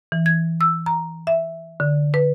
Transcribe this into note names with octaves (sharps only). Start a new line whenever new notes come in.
E3
G#6
E6
A#5
E5
D3
B4